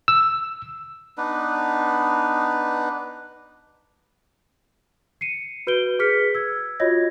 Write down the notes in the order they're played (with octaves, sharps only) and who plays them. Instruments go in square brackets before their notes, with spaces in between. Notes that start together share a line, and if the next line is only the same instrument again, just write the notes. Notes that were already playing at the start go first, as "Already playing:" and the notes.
[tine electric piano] E6
[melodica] B3 D4 D#4 B4
[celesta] C7 C#7 D#7
F#4 B4 G6 D7 G7
G#4 B4 F6 B6 C#7
E6 G#6
F4 F#4 C#5 D#5 G#6 A#6